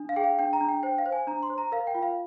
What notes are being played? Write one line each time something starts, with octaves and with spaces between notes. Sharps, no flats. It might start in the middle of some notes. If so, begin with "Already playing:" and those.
Already playing: D4
F5
G#4 G5
F5
D4 G5
A#5
D4
G5
C5 G5
F5
C5
G#5
D4 A#5
C6
C5
A#5
A#4 F5
G5
F4
F5